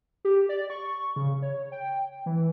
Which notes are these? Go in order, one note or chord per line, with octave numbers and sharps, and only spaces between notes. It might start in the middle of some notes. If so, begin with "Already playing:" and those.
G4
D5
C#6
C#3
C#5
G5
E3